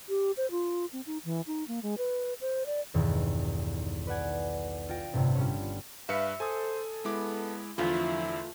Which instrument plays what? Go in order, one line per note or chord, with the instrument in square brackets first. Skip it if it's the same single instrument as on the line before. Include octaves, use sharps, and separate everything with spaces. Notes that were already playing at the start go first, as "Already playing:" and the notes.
[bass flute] G4
C5
F4
C4
D#4
E3
D#4
A#3
G#3
B4
C5
D5
[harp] B1 E2 G2 D#3 G3
B4 D5 F#5 G#5
F4 G5 A#6 D7
G1 A2 C3 G3
G3 C#4 C#5
[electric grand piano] G2 B4 C#7 [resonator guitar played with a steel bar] E5 [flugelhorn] F5
[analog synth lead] A4 [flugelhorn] C5 [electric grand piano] G#5 D#6
[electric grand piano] G#3 E4 D6 [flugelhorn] B3
[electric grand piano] E2 D3 [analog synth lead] F3 [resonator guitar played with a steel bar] A3 F4 [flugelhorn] E4